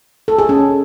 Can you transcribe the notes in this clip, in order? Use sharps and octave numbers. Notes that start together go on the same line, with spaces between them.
A4
G#4
C#4